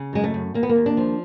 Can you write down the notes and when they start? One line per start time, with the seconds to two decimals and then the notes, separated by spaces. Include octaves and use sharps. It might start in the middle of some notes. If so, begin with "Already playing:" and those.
Already playing: C#3
0.13 F#2 G#3
0.24 A3
0.34 F#2
0.54 D#2 A#3
0.63 B3
0.69 A#3
0.76 D#2
0.86 D4
0.97 F3